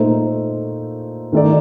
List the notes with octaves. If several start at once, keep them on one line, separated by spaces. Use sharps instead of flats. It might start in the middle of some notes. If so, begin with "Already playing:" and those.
Already playing: A#2 A3 D#4 A4 C5
D#3 A3 D#4 A4 D5